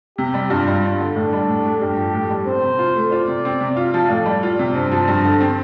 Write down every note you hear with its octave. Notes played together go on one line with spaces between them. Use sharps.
C3 G4
G3
G2 F4
G3
D4
D3
A2 D4
G3
A2
A3
G2 G4
F3
A2
G3
C4 C5
C3
F4
A3
F4 D5
C3
C4
C3
F4 F5
F3
A2 D5
G3
F4
C3
G2 C5
F3
G2
D3
C4